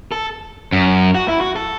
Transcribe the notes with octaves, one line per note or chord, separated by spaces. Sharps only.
A4
F#2
F#4
E4
F#4
A4